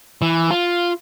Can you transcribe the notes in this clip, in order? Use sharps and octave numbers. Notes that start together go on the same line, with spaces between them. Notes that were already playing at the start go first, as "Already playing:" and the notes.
E3
F4